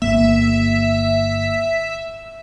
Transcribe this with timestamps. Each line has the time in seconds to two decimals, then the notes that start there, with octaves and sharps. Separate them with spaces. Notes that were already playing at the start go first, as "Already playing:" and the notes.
0.02 G1 F#2 A#3 E5